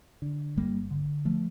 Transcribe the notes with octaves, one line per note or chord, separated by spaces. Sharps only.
D3
G1 G3 A#3
D3
F3 A3